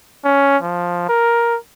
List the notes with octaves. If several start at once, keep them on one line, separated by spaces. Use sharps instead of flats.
C#4
F3
A#4